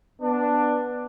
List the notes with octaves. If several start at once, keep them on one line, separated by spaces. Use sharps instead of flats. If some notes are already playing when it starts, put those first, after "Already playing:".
B3 D4